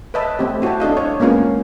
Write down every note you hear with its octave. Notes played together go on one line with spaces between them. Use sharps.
B4 C#5 D#5 E5 A5
A3 C4 G4
E4 F#4 C#5 G5 A5
D4 A4 D#5 F5
C#5
G#3 A#3 B3 C#4 F4